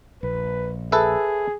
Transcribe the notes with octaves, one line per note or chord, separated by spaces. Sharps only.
A#1 B4
G#4 A4 B4 E5